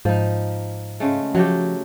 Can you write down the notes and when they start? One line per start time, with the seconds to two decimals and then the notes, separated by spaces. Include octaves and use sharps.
0.05 G#2 F3 D#4
1.00 C#3 G#3 A3
1.35 F3 F#3 A3 G4